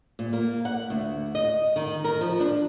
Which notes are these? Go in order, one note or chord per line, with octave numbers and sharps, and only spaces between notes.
A#2
A#3
F#5
D2
D#5
D#3
A#4
F3
D4